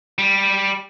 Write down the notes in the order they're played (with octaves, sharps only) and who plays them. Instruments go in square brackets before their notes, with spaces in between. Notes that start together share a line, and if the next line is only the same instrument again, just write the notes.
[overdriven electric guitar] G3